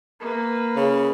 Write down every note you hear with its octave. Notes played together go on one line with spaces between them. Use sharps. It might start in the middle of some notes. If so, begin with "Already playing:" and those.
A#3 B4
C#3